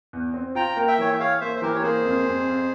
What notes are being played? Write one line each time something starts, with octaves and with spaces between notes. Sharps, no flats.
E2
C4
F4 G5 A#5
A#3
E5 G5
E3 C#5
E5
G#4 C#5 F5
A#3 C5 E5
C5
E3 G4 A#4
C#5
A#3 G#4 C5
F2
F2
F2